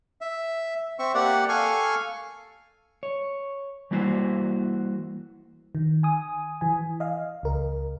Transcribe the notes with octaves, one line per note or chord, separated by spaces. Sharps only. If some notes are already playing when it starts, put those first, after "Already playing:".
E5
C4 E5 C#6
A#3 G4 D5 F#5
A4 F5 G#5 C#6
C#5
E3 G3 A#3 E4 F#4 C5
D#3
G#5 D#6
E3 G#5
D#5 F5
C#2 A#4